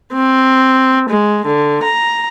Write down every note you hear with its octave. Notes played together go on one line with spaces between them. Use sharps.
C4
G#3
D3
A#5